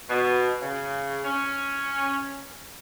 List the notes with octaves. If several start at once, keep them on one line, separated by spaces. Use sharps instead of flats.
B2
C#3
C#4